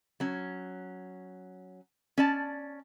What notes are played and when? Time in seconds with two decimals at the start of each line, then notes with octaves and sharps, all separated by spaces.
0.20 F#3 C#4
2.18 C#4 D5 A5